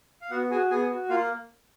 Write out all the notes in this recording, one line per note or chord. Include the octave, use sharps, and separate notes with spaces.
F5
B3 F#4 F#5
F#4 G#4 G#5
B3 G#4 G#5
F#4
A#3 F4 F5